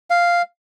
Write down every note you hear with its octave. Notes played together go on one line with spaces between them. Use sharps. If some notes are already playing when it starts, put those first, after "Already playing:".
F5